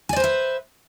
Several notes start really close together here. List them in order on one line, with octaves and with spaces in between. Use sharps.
G#5 D5 C5 B4 E5